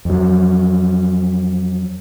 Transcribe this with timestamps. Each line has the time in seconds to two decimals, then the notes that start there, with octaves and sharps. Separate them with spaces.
0.05 F2 F#3